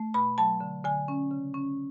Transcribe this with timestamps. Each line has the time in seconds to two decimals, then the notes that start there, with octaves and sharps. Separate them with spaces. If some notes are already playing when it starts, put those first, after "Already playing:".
Already playing: A3
0.14 B2 B5
0.38 F#3 A5
0.61 D3
0.84 D3 G#5
1.08 C#4
1.31 C#3
1.54 C#4